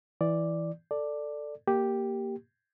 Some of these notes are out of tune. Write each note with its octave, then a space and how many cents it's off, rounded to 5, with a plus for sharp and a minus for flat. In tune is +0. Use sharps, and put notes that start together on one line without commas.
E3 +0 D5 +0
A4 +10 D5 +5
A#3 +0 G4 +0